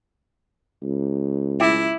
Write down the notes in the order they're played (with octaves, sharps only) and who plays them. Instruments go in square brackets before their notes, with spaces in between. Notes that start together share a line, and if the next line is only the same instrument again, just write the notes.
[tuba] C#2
[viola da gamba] E4 [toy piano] E5 G#5 D6